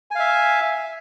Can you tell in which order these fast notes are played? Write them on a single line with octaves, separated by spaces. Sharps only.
G#5 F5 E5